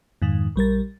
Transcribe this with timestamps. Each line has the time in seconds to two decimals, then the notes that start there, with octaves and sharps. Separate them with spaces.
0.22 F2 G#2 D#3
0.56 A#1 G3 A#4 A6